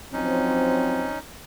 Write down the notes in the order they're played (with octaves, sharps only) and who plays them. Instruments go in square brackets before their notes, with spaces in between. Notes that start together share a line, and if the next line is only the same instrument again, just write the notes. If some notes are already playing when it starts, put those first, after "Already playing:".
[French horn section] F3 F#3 C4 [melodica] C#4 D#4